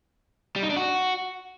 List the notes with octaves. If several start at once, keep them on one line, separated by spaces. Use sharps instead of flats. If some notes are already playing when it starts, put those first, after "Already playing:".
G3
D#4
D4
F#4